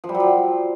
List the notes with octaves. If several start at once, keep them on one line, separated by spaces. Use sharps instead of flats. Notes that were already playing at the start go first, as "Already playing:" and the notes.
F3
G3
F#3
F3